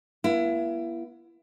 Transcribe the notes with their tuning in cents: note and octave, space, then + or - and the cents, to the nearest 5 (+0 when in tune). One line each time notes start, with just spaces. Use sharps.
B3 -45 E4 +30